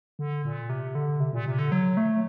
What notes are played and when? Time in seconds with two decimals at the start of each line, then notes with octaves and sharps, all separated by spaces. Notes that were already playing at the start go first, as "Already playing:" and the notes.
0.19 D3
0.45 A#2
0.69 C3
0.95 D3
1.20 C3
1.33 A#2
1.46 C3
1.59 D3
1.72 F#3
1.97 A3